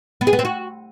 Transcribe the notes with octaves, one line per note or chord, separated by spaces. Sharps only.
B3
G#4
B3
C4
F#4